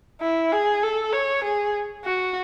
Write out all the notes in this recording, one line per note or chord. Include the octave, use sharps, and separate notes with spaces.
E4
G#4
A4
C#5
G#4
F#4